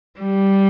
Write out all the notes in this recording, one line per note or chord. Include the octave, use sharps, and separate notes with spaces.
G3